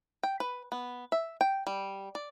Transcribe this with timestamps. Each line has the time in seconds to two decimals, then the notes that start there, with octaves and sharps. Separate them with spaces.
0.23 G5
0.40 B4
0.72 B3
1.12 E5
1.41 G5
1.67 G3
2.15 D5